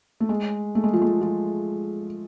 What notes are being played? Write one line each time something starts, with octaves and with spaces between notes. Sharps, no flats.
A3
G#3
A3
G#3
F3
G#3
F3